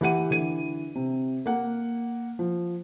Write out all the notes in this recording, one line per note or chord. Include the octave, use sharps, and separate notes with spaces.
E3 G4 F#5 D#7
D3 E3 D#7
C3
A#3 F#5
F3